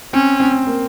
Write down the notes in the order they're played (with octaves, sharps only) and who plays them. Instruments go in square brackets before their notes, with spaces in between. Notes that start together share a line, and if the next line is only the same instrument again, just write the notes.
[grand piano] C4 [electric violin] C#4
[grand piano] C4
A#3